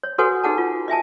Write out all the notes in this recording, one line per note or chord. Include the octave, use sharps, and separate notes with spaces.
C#5
F#4 A4 B4 C#5 F#5 G#5
D#4 G#4 F#5 A5
F4
D#5 E5 G#5 A5